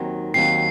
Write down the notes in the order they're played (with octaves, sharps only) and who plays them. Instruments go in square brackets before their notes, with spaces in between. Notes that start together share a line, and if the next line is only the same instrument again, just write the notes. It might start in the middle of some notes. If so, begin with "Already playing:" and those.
Already playing: [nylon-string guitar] D#2 D#3 F#3 C4
[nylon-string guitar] D#2 D#3 F#3 C4 [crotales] C7